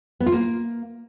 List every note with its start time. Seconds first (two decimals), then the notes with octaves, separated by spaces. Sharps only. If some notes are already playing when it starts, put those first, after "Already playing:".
0.20 B3
0.26 F4
0.32 A#3